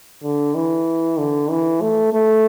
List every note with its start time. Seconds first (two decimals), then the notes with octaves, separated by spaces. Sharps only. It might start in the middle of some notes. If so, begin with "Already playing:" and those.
0.23 D3
0.55 E3
1.19 D3
1.50 E3
1.81 A3
2.13 A3